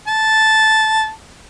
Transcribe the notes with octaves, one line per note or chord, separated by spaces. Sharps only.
A5